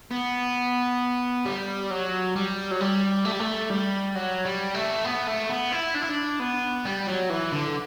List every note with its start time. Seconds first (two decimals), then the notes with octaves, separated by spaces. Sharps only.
0.11 B3
1.46 G3
1.91 F#3
2.36 G3
2.71 F#3
2.81 G3
3.25 A3
3.32 G3
3.40 A3
3.70 G3
4.15 F#3
4.45 G3
4.75 A3
5.05 B3
5.28 A3
5.50 B3
5.72 E4
5.95 D4
6.02 E4
6.09 D4
6.40 B3
6.85 G3
7.07 F#3
7.29 E3
7.52 D3